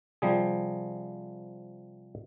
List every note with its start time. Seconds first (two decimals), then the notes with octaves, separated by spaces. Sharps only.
0.22 C3 F3 G3 G#4